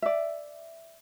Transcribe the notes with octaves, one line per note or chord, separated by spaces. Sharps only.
D5 E5